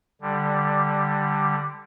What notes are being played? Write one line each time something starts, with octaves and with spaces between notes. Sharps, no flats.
D3 G3